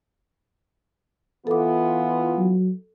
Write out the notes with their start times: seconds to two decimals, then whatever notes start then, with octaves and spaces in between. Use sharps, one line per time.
1.47 E3 B3 F4 A4 D6
2.38 F#3